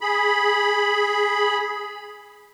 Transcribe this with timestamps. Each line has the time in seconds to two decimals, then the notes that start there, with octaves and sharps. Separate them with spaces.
0.01 G#4 B5